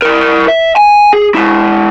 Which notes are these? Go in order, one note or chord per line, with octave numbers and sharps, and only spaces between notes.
E4 A#4
E5
G#5
G#4
G#3 E4